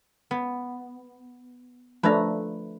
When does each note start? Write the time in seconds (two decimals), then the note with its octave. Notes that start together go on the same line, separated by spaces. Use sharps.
0.31 B3
2.03 F3 A3 D4 B4 A#5